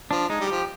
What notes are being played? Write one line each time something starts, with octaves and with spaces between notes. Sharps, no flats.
F3 D4
G#3 D#4
G3
F3 G4